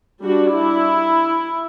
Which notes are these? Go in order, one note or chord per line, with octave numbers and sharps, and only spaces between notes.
G3 D4 F#4
E4